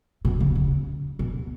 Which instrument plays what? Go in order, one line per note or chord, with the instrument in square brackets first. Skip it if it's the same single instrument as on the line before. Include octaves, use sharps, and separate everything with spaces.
[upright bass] B2
C#3
C#3
B2